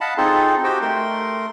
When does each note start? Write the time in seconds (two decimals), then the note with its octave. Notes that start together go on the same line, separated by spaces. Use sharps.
0.01 D#5 F5 F#5 A5 B5
0.17 C4 D#4 F4 G#4 A4
0.64 F#4 G4 C5 D#5 G5
0.81 A3 A#4 C6